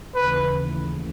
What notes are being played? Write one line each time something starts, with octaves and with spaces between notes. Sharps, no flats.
D#2 C#3 E3 A3 B4